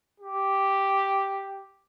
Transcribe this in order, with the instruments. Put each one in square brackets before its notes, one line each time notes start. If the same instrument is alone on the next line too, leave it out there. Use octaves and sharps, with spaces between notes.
[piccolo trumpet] G4